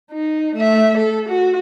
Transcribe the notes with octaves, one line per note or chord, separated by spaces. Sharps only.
D#4
A3 E5
A4
F#4